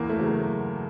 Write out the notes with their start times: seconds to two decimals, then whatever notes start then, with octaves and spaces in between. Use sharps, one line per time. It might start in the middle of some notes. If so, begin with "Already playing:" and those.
Already playing: E2 A#3
0.09 A3
0.19 C#3 F#3